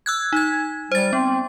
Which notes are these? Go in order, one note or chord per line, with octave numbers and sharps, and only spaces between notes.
E6 F#6 G#6
D#4 G#6
G3 C5 A6
B3 C4